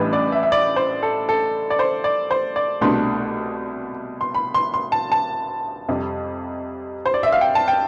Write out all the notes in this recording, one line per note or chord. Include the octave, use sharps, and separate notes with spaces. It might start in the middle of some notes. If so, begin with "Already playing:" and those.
Already playing: A1 A2 E3 G3 D4 B4
D5
E5
E5
D5
C5
A4
A4
D5
C5
D5
C5
D5
C2 B2 A3 D4 C6
C6
B5
C6
C6
A5
A5
F2 C3 G3
C5
D5
E5
F5
G5
A5
G5